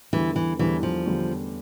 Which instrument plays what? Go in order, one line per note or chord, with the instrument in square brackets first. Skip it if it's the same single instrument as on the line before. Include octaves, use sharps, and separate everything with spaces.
[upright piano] E2 D3 G3 [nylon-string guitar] E3
[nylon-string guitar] E3
[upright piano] E2 D3 G3 [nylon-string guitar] E3
[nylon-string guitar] F3
[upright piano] E2 D3 G3